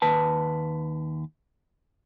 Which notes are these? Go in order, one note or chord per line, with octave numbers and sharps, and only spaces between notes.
D#2 B4 A5